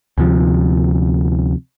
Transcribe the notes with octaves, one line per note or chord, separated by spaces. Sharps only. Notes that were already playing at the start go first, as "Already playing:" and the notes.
D2 C3 F3